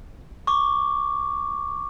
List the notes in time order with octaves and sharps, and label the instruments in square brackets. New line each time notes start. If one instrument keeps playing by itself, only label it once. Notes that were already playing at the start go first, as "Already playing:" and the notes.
[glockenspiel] C#6 D6